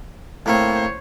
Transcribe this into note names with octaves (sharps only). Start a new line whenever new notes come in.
A2 A#3 C4 C5 C#5